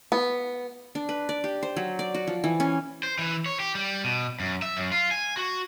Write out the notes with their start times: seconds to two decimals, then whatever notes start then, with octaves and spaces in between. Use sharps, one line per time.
0.12 B3
0.95 D4
1.09 B4
1.29 D5
1.44 G4
1.63 C5
1.77 F#3
1.99 D5
2.14 F#4
2.27 F3
2.44 E3
2.60 C#4
3.03 C5
3.19 E3
3.46 C#5
3.60 G4
3.75 G3
4.04 B2
4.40 F#2
4.62 E5
4.77 F#2
4.92 F4
5.11 G#5
5.37 F#4